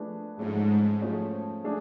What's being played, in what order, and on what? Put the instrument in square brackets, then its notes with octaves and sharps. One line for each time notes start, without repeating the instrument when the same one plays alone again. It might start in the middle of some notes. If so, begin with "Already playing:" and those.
Already playing: [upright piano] F3 A3 D4 G#4 B4
[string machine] G#2 [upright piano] F3 A3 C#4 G#4
[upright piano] F3 A3 C#4 G#4
A3 D4 G#4